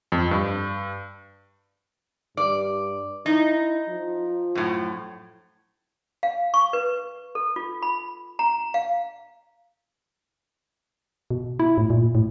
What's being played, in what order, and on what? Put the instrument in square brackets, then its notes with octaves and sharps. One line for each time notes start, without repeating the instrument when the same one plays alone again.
[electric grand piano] F2
G2
[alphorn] G2 [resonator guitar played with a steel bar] D5
[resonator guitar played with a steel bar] D#4 [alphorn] E4
[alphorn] F3
[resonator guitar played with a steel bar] F#2 A2
[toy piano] F5
C#6
B4
A4
F4
B5
A#5
F5
[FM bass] B2
E4
A2
A#2
A2